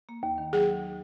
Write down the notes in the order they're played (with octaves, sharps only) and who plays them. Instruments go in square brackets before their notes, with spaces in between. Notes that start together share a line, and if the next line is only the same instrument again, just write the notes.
[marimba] A#3
D#2
D#3
[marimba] F#3 [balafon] G#4